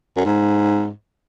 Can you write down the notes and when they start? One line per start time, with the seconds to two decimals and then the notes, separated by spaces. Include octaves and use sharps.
0.16 F#2
0.25 G#2